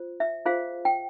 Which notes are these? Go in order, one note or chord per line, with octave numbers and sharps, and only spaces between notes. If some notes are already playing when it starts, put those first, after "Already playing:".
Already playing: F4 C5
E5
F4 G#4 C5 F5
G5